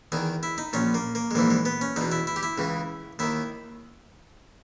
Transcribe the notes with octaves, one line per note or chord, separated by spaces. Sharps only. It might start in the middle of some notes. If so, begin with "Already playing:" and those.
E2 D#3 G#4
E4
D#4
A#1 A#2 C#4
A#3
A#3
G#3
A#1 G#2 E3 A#3
G#3
B3
C#4
E2 B2 D#4
E4
E4
G4
E4
C#2 C#3 E3
D#2 D#3 E4